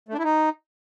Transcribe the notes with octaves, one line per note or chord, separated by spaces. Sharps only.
A3
D4
E4
D#4